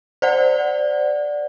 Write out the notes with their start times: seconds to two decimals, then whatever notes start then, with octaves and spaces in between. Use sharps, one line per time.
0.22 C5 D5 F#5